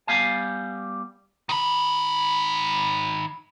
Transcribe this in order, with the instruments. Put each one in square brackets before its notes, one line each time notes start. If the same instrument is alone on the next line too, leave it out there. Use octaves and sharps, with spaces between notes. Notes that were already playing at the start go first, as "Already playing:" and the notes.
[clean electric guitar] G3 B3 F5 G#5
[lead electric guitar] D#3 B5